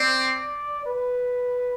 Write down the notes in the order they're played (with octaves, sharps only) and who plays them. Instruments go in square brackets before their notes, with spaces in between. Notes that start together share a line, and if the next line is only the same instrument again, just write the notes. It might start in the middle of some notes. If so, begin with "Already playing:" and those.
Already playing: [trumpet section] C4 [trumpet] D5
[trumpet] B4